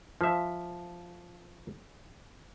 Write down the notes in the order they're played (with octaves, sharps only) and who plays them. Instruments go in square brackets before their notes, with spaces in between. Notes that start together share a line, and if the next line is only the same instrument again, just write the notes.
[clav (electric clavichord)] F3 E5